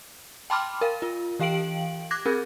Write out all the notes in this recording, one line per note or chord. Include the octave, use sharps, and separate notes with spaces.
G5 A5 B5 C6 D6 F6
A#4 F5
F4
E3 G4 F5 G5 D7 F#7
D6 F#6 G#6 A#6
C4 G#4 A#4